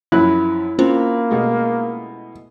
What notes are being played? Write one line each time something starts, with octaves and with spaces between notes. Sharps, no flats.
F#2 F3 E4 F#6
A#3 C4 C#4 F4 C5
B2 G#3 A3